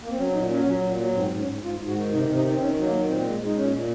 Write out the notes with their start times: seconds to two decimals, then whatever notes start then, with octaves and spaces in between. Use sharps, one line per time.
0.02 A#3
0.10 C4
0.18 F#3 C#4
0.34 A#2 D#4
0.49 F#3 C#4
0.65 F#3
0.82 A#2
0.98 F#3
1.14 G#2 C4
1.30 G#2
1.39 C#4
1.46 G#2
1.63 G#2 F4
1.78 G#2
1.87 F#4
1.95 D#3
2.11 C3 D#4
2.28 C3
2.35 D#4
2.43 D#3
2.48 C4
2.60 D#3 C#4
2.76 F#3
2.84 A#3
2.92 D#3
3.08 A#2 C4
3.24 G#3
3.40 G#3
3.46 D#4
3.56 A#2 C#4
3.72 A#2